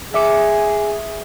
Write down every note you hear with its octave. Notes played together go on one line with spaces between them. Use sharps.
G#4 E5 D6 C#7